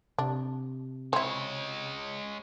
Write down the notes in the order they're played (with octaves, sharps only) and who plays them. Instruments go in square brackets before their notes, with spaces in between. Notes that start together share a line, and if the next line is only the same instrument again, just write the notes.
[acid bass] C3 [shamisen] D4
[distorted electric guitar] G#3 C#5 [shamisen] C4 E4